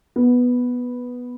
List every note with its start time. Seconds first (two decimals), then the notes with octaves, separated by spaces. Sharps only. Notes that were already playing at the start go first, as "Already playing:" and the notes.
0.16 B3